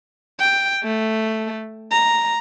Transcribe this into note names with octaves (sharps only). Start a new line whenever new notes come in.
G5
A3
A#5